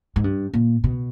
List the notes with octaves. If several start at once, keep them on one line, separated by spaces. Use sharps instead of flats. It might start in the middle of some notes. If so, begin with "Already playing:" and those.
G#2
G2
A#2
B2